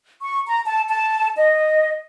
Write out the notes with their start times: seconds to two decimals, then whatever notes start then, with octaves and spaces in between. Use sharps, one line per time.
0.21 C#6
0.46 A#5
0.65 A5
0.88 A5
1.36 D#5